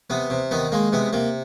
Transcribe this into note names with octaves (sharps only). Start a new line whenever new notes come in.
C3 B3
C3
D#3 B3
G#3 A#3
C3 B3
C3 A#3